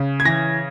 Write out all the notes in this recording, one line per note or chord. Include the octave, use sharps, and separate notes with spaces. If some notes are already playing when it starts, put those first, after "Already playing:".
Already playing: C#3
G#6
E3 A#6